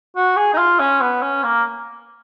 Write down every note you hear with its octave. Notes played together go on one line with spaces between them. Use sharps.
F#4
G#4
D#4
F4
C#4
B3
C#4
A#3